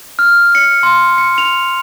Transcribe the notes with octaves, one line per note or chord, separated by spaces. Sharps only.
F6
C#7
C6
C#7
F7